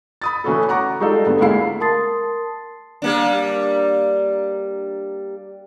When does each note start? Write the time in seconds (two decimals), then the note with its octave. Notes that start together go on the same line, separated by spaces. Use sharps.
0.22 B5 D#6 A6
0.44 E3 A3 C#4 F#4 A4
0.69 F#5 A#5 C#6 D6
1.00 G3 G#3 D#4 F4 A4
1.26 G2 D3 A3 B3
1.40 D2 G#3 A#3 E4 F5 C7
1.80 A#4 A5 C6 D#6 A6 C7
3.02 G3 A#3 D4